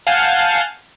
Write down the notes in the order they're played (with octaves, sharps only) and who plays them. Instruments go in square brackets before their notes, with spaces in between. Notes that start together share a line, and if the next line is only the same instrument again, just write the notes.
[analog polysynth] F5 F#5 G#5 A5 G6